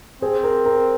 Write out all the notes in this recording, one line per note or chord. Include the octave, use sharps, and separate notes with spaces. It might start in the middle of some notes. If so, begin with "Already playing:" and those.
C4 G#4 C5
A#4
A#4